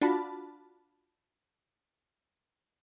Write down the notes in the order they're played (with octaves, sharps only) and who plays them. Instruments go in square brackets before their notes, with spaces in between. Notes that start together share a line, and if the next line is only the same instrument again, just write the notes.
[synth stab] D4 F4 F#4 A5 B5